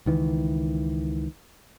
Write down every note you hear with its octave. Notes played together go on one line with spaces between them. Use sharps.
C#2 D#3 E3